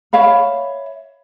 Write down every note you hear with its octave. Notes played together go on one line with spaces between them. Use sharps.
C#5 E5 F5 B5